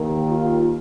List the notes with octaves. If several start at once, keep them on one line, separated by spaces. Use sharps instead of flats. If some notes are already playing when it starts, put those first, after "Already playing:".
Already playing: D#2 D#3 A#3
F4